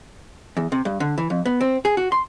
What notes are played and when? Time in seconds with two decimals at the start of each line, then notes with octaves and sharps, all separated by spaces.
0.57 E2
0.72 C3
0.85 G2
1.00 D3
1.18 E3
1.30 F2
1.46 B3
1.61 C4
1.85 G#4
1.97 F#4
2.12 C6